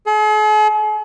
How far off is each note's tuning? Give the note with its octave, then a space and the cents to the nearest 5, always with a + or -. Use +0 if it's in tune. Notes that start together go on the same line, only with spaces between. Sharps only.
G#4 +45